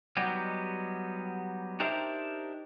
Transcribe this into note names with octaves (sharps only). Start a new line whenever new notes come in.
F#3 G3 B3 D#4 G4
D4 D#4 G4 A#4 C5 E5